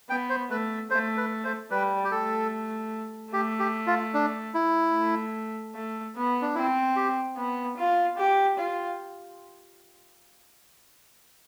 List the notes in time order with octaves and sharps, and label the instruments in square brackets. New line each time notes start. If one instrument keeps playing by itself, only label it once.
[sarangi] B3 [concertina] G5
[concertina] C5
[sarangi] A3 [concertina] B4
[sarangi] A3 [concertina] C5
[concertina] B4
C5
[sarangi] G3 [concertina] B4
[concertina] G4
[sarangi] A3 [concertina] A4
[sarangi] A3 [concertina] G4
[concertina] G4
F4
D4
E4
[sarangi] A3
A3
B3
[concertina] D4
[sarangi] C4 [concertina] E4
[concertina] G4
[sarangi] B3
F4
G4
F4